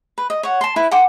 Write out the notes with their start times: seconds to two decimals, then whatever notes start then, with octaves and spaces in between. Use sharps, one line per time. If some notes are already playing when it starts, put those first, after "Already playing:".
0.18 B4
0.30 D#5
0.43 C#5 F#5
0.61 A5 C6
0.76 E4 B4
0.91 F#5 G5 C6 D6